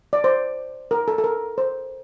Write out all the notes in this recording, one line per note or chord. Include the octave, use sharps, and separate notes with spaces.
D5
C5
A#4
A4
A4
A#4
C5